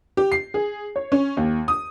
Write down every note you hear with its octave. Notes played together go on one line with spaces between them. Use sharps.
G4
C7
G#4
C#5
C#4
D#2
D#6